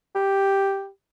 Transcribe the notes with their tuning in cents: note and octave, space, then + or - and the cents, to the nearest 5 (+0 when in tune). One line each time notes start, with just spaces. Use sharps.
G4 +0